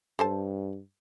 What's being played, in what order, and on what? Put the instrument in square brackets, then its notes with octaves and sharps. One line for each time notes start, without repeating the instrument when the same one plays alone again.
[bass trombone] G2 [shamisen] A4 C5 A5